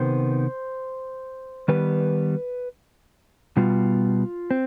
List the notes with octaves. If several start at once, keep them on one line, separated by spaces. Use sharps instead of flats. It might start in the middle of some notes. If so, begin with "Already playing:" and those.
Already playing: C3 D#3 B3 C5
D#3 G3 B3 B4
B2 G3 B3 F4
C4